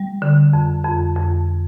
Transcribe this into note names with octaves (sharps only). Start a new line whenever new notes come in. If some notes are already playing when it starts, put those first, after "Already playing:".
Already playing: G3
D3
F2
F2
F2